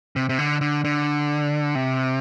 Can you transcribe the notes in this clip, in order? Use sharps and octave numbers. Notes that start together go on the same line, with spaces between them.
C3
C3
D3
D3
D3
C3